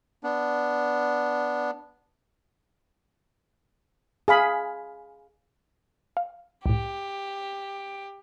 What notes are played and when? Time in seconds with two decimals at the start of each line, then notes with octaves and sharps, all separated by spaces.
0.24 B3 D4
4.28 G#4 F5 B5
6.17 F5
6.66 C2 A2 G4